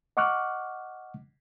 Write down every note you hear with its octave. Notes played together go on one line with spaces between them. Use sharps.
D#5 F#5 C#6 D6 F6 F#6